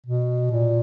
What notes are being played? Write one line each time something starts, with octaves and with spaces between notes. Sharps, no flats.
B2
A#2